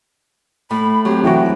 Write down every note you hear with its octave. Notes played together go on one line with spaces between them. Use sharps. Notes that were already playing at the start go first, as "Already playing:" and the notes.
A2 B5
F#3 C4 G4
E3 F#4 G5